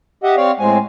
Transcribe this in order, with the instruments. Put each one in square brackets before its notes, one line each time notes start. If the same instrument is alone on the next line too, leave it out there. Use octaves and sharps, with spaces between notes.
[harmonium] G4 D#5 E5 F#5
C4 C#5 D5 F5
A2 G#3 C4 G#5